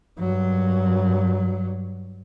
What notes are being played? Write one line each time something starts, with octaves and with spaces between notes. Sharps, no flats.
G2 F#3